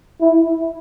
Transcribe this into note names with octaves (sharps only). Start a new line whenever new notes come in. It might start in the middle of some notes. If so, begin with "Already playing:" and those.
E4